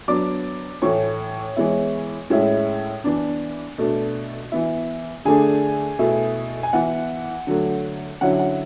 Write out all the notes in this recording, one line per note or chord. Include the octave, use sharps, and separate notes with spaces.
F#3 B3 D4 D5 D6
A2 E3 A3 C#5 C#6
E3 G#3 B3 E4
A2 G#3 C#4 E4
E3 B3 D4
B2 A3 D4
E3 B3 E4
D3 A3 D4 G#4 G#5
B2 A3 E4
G#5
E3 B3 E4 F#5
D3 F#3 A3
D3 F#3 C#4 E4 F#5
F#5